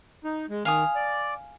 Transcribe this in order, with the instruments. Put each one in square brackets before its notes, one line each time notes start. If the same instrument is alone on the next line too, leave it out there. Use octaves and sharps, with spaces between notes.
[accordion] D#4
G#3
[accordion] D#3 [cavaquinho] F5 G#5 D#6
[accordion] D5